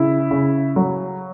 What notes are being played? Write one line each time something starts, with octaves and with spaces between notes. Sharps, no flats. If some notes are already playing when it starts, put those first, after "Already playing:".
Already playing: C#3 E4
C#3
F#3